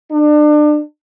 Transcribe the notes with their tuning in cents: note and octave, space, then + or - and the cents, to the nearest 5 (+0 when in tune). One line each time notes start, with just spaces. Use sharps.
D4 +30